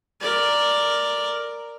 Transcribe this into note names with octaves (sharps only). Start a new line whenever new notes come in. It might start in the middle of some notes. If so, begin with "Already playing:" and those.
A#4 D5